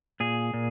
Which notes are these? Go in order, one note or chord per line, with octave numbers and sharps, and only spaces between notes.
A#2 G#4
A#2